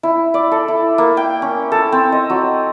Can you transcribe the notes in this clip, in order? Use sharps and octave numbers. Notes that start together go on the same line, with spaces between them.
E4
D5
A4
E4
A#3
G5
C#4
A4
C4
D#5
F#3